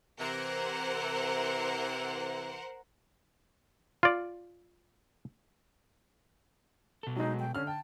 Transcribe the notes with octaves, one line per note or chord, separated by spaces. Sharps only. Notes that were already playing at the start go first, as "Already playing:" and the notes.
C3 E3 A#4 C5 F#5
F4 D5
B2 A4
F#3 G#3 D#4
G5
D3 C#4 F6
G5 A5